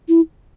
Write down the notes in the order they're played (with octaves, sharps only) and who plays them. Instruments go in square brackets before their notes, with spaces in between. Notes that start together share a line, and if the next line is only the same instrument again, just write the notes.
[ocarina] E4